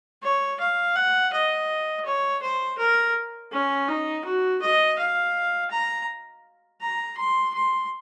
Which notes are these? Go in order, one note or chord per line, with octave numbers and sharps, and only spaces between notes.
C#5
F5
F#5
D#5
C#5
C5
A#4
C#4
D#4
F#4
D#5
F5
A#5
A#5
C6
C6